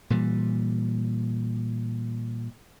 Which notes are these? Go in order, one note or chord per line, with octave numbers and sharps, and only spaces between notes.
A#2 E3 G3